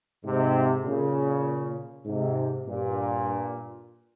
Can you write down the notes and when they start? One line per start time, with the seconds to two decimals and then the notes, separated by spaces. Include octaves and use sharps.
0.25 G#2 C3
0.84 A#2 C#3
2.06 G#2 C3
2.66 G2 A#2